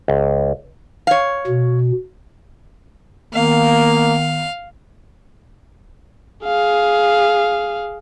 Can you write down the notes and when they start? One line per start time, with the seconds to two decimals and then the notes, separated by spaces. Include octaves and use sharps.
0.08 C#2
1.07 C#5 F5
1.47 B2
3.34 D#3 A#3 B3 F5
6.45 G#4 F5